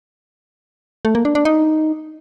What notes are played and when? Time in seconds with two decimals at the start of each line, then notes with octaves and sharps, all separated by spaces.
1.05 A3
1.15 A#3
1.25 D4
1.35 D4
1.45 D#4